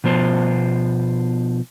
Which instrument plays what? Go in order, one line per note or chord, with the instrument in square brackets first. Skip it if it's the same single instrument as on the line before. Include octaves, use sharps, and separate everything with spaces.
[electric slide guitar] B2 F3 B3 C5